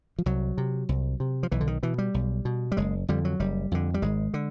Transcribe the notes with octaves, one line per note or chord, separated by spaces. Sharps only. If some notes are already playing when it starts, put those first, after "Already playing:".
F3
C2 F#3
C3
C2
C3
F3
B1 E3
D3
D#3
B2 E3
G3
B1
B2
G3
F#1 G#3
F2 D3 G3
F#3
F#1 G3
F2 D3
G3
G#1 G#3
D3